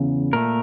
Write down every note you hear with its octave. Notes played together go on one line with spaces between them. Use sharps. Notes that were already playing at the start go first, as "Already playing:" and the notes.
Already playing: E2 C#3
A#2 A3 A#4